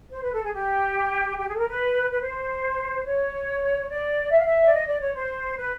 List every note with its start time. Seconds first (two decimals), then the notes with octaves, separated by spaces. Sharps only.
0.11 C5
0.22 B4
0.32 A4
0.43 G#4
0.53 G4
1.37 G4
1.47 G#4
1.54 A4
1.58 A#4
1.68 B4
2.11 B4
2.21 C5
3.05 C#5
3.89 D5
4.30 E5
4.38 F5
4.45 E5
4.63 D5
4.72 D#5
4.87 D5
5.00 C#5
5.14 C5
5.57 B4